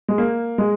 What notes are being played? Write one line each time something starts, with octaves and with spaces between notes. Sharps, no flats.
G#3
A#3
G#3